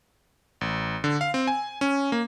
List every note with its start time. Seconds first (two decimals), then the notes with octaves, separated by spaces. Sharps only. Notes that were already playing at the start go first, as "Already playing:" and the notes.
0.61 A1
1.04 D3
1.21 F5
1.34 C4
1.47 G#5
1.81 C#4
2.12 A#3